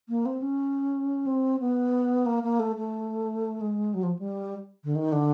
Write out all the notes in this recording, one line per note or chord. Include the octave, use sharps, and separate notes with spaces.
A#3
C4
C#4
C4
B3
A#3
A#3
A3
A3
G#3
F#3
F3
G3
D3
D#3
D3